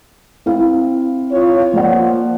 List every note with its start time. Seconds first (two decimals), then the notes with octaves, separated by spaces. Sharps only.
0.46 C4 E4 F5
1.31 F4 C#5
1.74 F3 A#3 D5 F#5